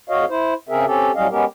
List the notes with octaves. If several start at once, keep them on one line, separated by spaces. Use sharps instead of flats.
F2 F#4 C#5 D#5 F5
E4 C5
C#3 C4 G#4 A#4 E5
C4 C#4 G4 A4
A2 F#3 G3 C#4 D#5 F5
G#3 B3 C#4 G4 A#4